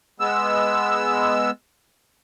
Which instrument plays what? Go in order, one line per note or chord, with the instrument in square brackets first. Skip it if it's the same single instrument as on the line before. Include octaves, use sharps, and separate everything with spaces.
[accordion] G#3 B3 E6